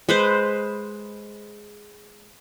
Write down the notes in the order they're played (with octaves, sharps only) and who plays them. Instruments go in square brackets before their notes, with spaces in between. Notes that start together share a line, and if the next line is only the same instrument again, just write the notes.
[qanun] G#3 B4 C5